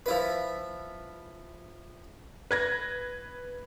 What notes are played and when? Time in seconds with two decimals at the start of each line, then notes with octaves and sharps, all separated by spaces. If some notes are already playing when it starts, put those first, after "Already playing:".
0.06 F3 E4 B4
2.51 B4 G#6 A#6